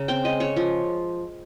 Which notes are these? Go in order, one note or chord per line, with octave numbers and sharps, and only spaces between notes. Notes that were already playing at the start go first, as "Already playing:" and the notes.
Already playing: C#3 A#5
C4 G5
G#3 D#5
C#3 C#5
F3